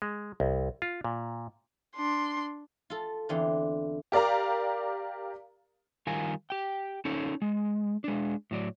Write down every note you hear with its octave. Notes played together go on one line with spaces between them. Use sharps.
G#3
C2
F4
A#2
D4 C6
F4 A4
E2 D3 C4 F4
G4 A#4 D5 F5 A#5
D#3 G3 F4 A#4 G#5
G4 G5
C#4 D#4 A4 C#5
G#3
G#3 D4
A2 F#3 D5